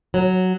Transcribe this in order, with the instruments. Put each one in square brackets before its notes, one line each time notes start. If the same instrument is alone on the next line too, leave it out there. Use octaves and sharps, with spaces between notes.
[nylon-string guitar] F#3